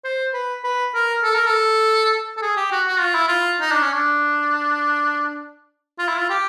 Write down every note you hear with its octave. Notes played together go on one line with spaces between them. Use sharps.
C5
B4
B4
A#4
A4
A#4
A4
A4
G#4
G4
F#4
F#4
F4
E4
F4
D#4
D4
C#4
D4
F4
E4
F4
G4